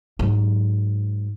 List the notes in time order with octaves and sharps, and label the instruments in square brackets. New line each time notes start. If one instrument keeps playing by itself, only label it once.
[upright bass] G#2 F#3